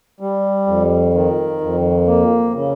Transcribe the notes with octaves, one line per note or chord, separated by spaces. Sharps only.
G3
F2
D#3
F2
A#3
C#3